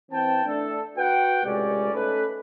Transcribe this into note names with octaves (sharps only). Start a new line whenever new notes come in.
E3 C4 G5 A5
A3 D4 A4
F#4 B4 F#5 G5
C#2 A2 C3 G#3 C#4 D5
A3 C#4 D#4 A4 B4